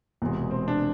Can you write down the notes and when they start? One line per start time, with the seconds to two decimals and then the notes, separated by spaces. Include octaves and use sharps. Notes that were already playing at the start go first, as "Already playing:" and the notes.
0.22 E1 E2 C3 G#3
0.51 C4
0.68 D4